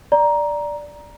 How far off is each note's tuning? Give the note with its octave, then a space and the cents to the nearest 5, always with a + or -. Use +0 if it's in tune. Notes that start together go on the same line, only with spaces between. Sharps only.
D5 +0 A#5 +10